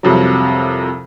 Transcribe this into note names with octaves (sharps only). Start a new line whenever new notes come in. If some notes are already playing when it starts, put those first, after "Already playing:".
C2 F2 C3 F#3